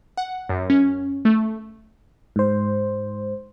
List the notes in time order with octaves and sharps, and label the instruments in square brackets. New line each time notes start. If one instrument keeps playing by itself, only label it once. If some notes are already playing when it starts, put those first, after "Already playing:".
[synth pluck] F#5
F#2
C#4
A3
[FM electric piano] G#2 C5